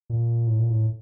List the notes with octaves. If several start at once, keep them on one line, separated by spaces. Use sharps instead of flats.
A#2
A2
A#2
A2